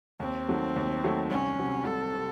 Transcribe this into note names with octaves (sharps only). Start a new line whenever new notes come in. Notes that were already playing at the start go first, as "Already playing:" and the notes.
D#2 C4
D#3 F#3 A3
D#2
D#3 F#3 A3
C2 C#4
C3 F#3
C2 A4
C3